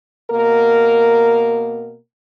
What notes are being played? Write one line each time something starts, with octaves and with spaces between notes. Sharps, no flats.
B2 A#3 A#4